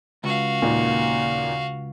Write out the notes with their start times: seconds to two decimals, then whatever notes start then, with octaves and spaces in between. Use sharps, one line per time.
0.24 C#2 F#4 F5
0.62 D#2 A#2